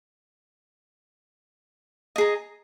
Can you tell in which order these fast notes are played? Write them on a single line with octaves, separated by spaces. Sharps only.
D#5 G#4 A#5